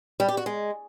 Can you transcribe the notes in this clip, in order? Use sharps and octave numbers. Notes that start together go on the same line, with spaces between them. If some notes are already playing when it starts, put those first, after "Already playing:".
G3
G4
F#4
G#3